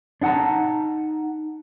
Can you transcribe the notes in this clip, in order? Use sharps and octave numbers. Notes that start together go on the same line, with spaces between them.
D4 D#4 F#5 A5 A#5